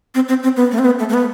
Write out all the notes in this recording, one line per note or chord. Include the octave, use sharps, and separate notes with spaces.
C4
C4
C4
B3
A3
C4
B3
A3
A3
B3